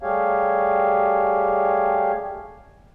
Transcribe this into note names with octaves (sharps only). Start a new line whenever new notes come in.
G3 A3 G4 G#4 C#5 F5